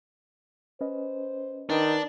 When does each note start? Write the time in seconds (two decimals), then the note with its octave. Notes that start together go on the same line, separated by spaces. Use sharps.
0.81 C#4 B4 C5 D#5
1.69 D#3 D4 B4